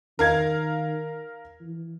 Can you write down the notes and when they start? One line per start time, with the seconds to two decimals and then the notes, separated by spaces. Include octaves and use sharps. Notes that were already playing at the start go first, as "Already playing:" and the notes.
0.19 D#3 A#4 F5 G#6
1.62 E3